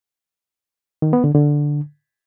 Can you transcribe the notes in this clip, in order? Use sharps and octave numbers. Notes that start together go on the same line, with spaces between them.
D#3
B3
D3
D3